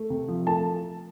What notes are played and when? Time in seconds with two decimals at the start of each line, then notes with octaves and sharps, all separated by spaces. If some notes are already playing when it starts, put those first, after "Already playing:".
Already playing: A3
0.10 C3
0.28 F3
0.47 A3 A5